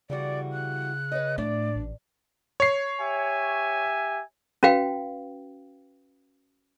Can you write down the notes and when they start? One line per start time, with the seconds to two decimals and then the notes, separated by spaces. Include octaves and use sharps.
0.10 C#3 E3 G3 F#4 D5
0.53 F#6
1.12 B4 C#5 D#5
1.38 A2 A3 D4 D5
1.75 A1
2.60 C#5 C7
3.01 G4 E5 G#5
4.63 C#4 F#4 B4 F5 G5